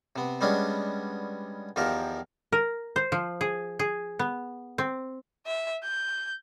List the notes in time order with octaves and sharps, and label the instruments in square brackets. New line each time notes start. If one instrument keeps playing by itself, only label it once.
[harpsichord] C3 B3
G3 G#3 B3 C#4 D4
E2 D#3 F3 F4 G4 A#4
[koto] A#4
C5
F3
G#4
G#4
B3
C4
[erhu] E5
G6